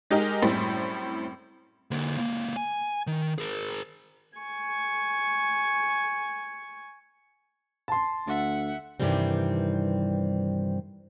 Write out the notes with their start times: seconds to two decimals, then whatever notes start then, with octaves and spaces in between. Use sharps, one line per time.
0.11 G#3 D#4 G4 G#4 A#4
0.42 F#2 A2 G3 C4 E4
1.91 D3 A#3
2.18 C#2 A#3
2.56 G#5
3.07 D#3
3.38 G#4 A#4
4.38 G#5 C#6
7.88 A5 C6
8.27 D2 E5 F#5
9.00 G2 C3 D#3 E3 G3 C4